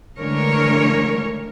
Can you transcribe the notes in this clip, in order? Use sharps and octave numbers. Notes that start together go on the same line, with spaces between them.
D3 E3 G#3 A3 A#4 C#5